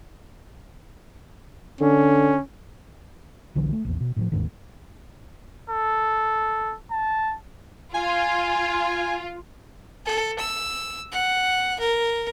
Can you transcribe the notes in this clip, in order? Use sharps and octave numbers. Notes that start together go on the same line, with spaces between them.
D3 C#4
B1 D3 E3 F#3
A3
A#1 E2
B2
A2 D#3 F3
G1 D#2 G#2 D#3
A4
A5
F4 G#5
A4
E6
F#5
A#4